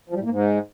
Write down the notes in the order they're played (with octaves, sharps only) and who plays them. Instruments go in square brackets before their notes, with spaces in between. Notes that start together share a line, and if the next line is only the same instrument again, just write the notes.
[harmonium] F3
G3
A2
A#3
G#2